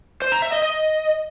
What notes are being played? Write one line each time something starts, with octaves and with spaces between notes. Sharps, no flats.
C5
A#5
E5
D#5
D#5